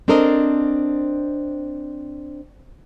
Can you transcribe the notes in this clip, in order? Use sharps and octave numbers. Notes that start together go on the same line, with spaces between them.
C4 D4 A4 A#4 C5 D#5